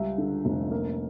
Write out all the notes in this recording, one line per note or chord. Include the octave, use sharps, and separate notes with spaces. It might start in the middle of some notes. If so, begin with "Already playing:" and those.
Already playing: C#2 G3 E5
D3
F1
A#3